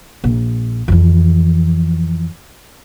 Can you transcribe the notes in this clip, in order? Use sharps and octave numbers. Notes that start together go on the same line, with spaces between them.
A#1
F2 E3